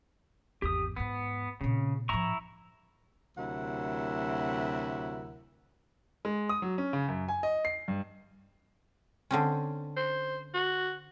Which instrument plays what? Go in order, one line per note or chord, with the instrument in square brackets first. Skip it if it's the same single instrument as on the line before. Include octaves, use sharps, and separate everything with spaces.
[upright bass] G#1 E2 [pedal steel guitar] G4 D#6
[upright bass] E2 G#2 [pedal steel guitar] B3
[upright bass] A#2 C4 [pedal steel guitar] C#3
[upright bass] A2 F3 [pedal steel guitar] E4 A#5 C#6
[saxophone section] D2 C3 F#3 E4 A#4 F#5
[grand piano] G#3
D#6
F#3
C#4
C#3
F#2
G#5
D#5
C7
G2
[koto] D3 C4 C#4
[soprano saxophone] C5
F#4